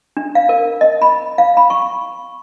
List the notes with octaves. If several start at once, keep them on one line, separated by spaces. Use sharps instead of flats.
D4
F5
A#4
D#5
B5
F5
B5
C#6